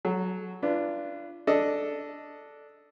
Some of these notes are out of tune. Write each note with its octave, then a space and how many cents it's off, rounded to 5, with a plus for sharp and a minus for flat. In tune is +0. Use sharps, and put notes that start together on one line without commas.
F#3 +0 A4 -35
D4 +0 F4 -35 B4 +0
D4 +0 A4 +0 D#5 +0